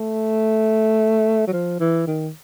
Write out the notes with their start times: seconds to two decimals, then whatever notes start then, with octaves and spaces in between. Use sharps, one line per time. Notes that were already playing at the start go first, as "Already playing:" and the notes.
Already playing: A3
1.47 F#3
1.53 F3
1.80 E3
2.07 D#3